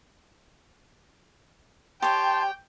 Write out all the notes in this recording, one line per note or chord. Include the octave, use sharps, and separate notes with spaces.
G4 C#5 G5 A5 C6